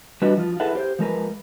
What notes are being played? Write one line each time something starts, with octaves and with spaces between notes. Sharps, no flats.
G3 D4 F#4 B4 D#5
F3 F4
E4 G#4 A4 B4 E5 F#5
G4 C5
F3 G#3 A#4 B4